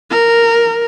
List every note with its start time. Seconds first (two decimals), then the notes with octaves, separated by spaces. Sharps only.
0.11 A#4